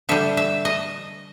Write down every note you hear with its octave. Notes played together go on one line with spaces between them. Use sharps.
D3 G3 E5
E5
D#5